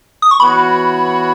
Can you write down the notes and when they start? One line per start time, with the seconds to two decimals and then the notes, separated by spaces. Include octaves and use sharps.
0.22 D#6
0.31 C#6
0.40 E3 B3 F#4 C#5 B5